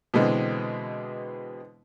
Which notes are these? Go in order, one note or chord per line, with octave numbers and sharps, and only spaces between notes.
B2 D3 E3 G#3 B3 C4